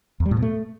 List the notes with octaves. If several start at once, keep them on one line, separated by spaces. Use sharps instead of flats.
E2
G3
A2
B2
A3